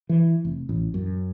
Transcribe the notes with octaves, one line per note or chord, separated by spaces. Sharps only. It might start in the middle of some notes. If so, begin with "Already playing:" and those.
E3
F1
A1
F#2